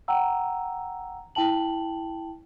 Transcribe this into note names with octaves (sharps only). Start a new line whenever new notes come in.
F#5 G5 A#5 E6
E4 G5 A5 F#7